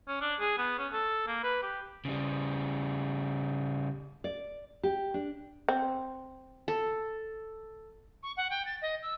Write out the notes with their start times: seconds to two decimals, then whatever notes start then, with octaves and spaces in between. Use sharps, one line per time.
0.08 C#4
0.21 D4
0.40 G#4
0.58 B3
0.78 C#4
0.93 A4
1.27 A#3
1.43 B4
1.62 G4
2.05 C#3 G3
4.24 D5
4.83 G4
5.14 D4
5.69 C4
6.68 A4
8.23 C#6
8.37 F#5
8.50 G5
8.65 A6
8.82 D#5
9.02 E6